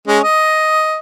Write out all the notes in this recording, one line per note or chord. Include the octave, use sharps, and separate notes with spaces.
G#3 C#4
D#5